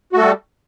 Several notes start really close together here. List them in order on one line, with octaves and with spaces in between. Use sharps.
F#4 A3 A4 G3